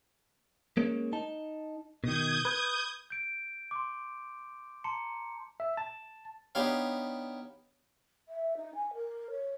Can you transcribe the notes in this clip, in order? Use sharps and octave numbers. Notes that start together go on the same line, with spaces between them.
G#3 A#3 C#4
D#4 A5
B2 D#3 D#6 G6 G#6
B4
G6 D7
C6 D6
A5 A#5 C6 C#7
E5
A5
B3 D4 D#4 G4 C#5 F5
E5
D#4
G#5
A#4
C#5